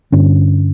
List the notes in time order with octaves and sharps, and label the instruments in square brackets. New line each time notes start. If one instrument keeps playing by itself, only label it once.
[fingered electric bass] G2 D3 C#4